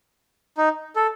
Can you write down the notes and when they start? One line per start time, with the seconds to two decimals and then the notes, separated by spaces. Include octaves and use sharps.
0.57 D#4
0.96 A4